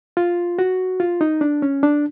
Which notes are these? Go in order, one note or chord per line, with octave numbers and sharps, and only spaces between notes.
F4
F#4
F4
D#4
D4
C#4
D4